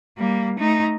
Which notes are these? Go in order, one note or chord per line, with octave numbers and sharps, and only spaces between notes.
G3 A#3
A3 D#4